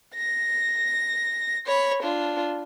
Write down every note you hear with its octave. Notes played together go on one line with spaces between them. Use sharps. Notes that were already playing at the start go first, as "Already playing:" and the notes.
A#6
C#5 B5
D4 F4